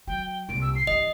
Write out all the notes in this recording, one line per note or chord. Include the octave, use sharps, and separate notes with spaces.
F#3 G5
G5
C2 A#2 D7
E6
C7
G2 E3 D#5